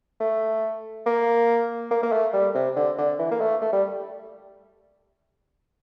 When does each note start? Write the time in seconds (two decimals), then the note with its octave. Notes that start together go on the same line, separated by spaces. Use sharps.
0.21 A3
1.06 A#3
1.91 A#3
2.03 A#3
2.12 A3
2.33 G3
2.55 C3
2.76 D3
2.98 D3
3.19 E3
3.31 A#3
3.41 A3
3.62 A3
3.73 G3